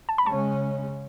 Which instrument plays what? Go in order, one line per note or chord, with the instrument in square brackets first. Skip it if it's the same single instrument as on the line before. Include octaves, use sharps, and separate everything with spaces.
[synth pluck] A5
B5
[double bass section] C#3 G#3 C#4 [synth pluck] A5 C#6